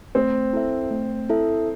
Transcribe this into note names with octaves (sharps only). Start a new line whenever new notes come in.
A3 C4
E4 A4 E5
A3
E4 A4 E5